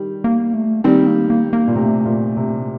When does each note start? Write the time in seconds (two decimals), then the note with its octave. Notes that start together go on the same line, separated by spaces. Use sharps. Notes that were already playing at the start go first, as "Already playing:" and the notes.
Already playing: D#3 G3
0.24 A#3
0.53 A3
0.84 D#3 G3 C4
1.07 A#3
1.30 A#3
1.53 A#3
1.67 A#2
1.75 C3 A3
2.05 A#2
2.37 C3